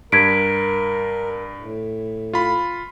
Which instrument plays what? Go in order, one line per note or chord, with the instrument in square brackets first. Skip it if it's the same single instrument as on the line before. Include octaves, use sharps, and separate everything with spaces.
[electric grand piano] G2 [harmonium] A#4 [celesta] G#6 B6 D7
[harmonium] A2
[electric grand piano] F4 B5